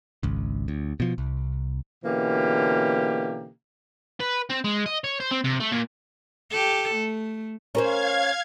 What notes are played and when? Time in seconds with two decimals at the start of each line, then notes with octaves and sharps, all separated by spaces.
0.23 G#1 C#2
0.68 D2
1.00 B2 F3
1.18 C2
2.05 B2 D3 E3 A#3 C#4 G4
4.20 B4
4.50 C4
4.64 G#3
4.86 D#5
5.04 C#5
5.20 C5
5.31 C4
5.44 C3
5.60 A3
5.72 A#2
6.50 G4 A4
6.94 A3
7.75 C#4 A#4 C5 F5 G#6